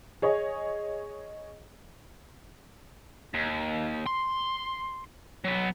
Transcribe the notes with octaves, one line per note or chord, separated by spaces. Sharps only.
G#4 C#5 D#5
D#2
C6
F#3 B3